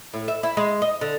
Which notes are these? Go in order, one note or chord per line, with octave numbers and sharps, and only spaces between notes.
A2
E5
E4
G#3
D#5
D3